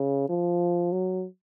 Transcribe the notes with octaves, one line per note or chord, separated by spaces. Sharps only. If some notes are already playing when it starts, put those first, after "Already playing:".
Already playing: C#3
F3
F#3